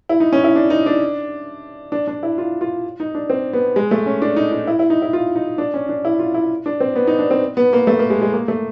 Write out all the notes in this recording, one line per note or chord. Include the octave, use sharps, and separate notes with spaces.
E4
D#4
C#4
E4
D4
D#4
D4
D4
D4
E4
F4
F4
D#4
D4
C4
B3
G#3
A3
C#4
D4
D#4
D#4
E4
E4
D#4
E4
F4
D#4
D4
C#4
D4
E4
F4
E4
D4
C4
B3
D#4
D4
C4
B3
A#3
A3
A#3
G#3
G#3
A#3
A3